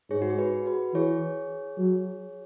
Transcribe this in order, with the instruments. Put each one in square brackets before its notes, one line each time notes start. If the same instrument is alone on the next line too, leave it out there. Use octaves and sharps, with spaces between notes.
[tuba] G#2 [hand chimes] G#4 C#5
[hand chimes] F#4
G#4
F#4 B4
F#4 B4
[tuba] E3 [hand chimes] G#4 C#5
[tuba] F#3